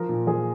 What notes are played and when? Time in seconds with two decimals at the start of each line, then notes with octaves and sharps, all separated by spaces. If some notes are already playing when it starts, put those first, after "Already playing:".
Already playing: F3 A#4
0.09 A#2
0.27 F3 G#4